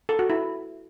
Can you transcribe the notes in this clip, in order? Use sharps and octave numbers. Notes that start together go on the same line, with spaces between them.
A4
F#4
E4